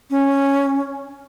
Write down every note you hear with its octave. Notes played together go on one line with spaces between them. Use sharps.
C#4